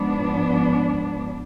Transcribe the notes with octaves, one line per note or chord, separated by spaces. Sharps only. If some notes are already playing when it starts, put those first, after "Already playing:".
Already playing: G#2 F3 B3 D4